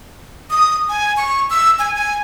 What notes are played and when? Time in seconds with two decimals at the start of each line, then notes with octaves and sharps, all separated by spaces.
0.50 D#6
0.89 G#5
1.17 C#6
1.50 E6
1.79 G#5
1.95 G#5